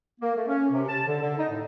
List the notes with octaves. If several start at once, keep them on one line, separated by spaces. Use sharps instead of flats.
A#3
A3
C#4
C3
A5
D3
D3
D#4
A2